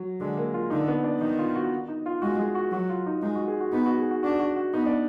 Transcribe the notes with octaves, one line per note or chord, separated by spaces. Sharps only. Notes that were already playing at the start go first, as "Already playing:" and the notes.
Already playing: F#3
D3 G#3
A#3
F4
D3 D#4
B3
D4
D#3 D#4
F4
F#4
D#4
F4
G#3 F#4
G#4
F#4
F#3 F#4
F4
D#4
G#3 D#4
F#4
G#4
F#4
B3 D#4
F#4
G#4
F#4
D4 F#4
F#4
F#4
B3 D#4
D4